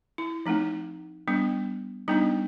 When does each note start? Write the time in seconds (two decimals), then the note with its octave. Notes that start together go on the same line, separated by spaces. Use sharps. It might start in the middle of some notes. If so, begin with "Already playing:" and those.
0.18 E4
0.46 F3 A3 C4 D#4
1.28 G3 B3 D4
2.08 G3 B3 D4 D#4